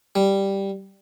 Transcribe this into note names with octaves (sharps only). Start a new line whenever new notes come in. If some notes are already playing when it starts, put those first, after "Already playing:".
G3